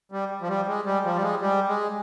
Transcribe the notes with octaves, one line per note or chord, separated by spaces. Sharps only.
G3
F3
G3
G#3
G3
F3
G3
G#3
G3
G#3